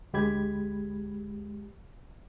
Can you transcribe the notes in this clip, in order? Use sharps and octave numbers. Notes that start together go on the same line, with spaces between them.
D2 G#3 G4 B5 G#6